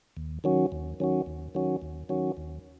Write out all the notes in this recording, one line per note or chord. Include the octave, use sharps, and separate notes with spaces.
D#2
D#3 F#3 C#4 F#4
D#2
D#3 F#3 C#4 F#4
D#2
D#3 F#3 C#4 F#4
D#2
D#3 F#3 C#4 F#4
D#2